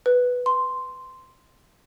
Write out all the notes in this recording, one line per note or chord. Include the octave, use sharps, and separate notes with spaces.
B4
C6